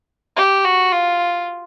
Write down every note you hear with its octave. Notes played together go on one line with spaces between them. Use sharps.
G4
F#4
F4